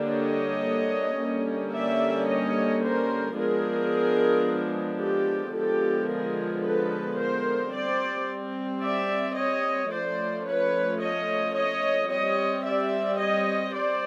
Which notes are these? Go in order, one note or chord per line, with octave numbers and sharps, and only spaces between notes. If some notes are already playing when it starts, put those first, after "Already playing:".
Already playing: D3 G3 A#3 D4
C#5 D#5
D3 G3 A#3 C#4
D5 E5
C#5 D#5
A#4 C5
F3 G#3 B3 D4 G#4 A#4
G4 A4
D3 F3 G#3 B3 G4 A4
G#4 A#4
A4 B4
A#4 C5
G3 C4 C5 D5
D5 E5
C#5 D#5
F3 A3 C#4 C5 D5
B4 C#5
C#5 D#5
C#5 D#5
G3 C4 C#5 D#5
D5 E5
C#5 D#5
C5 D5